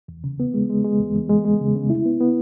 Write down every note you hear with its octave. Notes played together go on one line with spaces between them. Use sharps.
E2
C#3
B3
G#3
G#3
G#3
E2
E2
G#3
G#3
C#3
C#3
E4
B3
B3